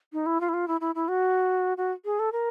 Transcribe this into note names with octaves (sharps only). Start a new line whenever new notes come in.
D#4
E4
F4
E4
F4
E4
E4
E4
F#4
F#4
G#4
A4
A#4